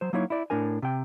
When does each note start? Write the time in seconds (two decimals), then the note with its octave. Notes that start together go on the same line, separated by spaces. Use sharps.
0.01 F#3 C5
0.13 F#3 A#3 D#4 E4 C#5
0.30 E4 D5
0.50 A2 D4 A#4 G#5
0.82 C3 G5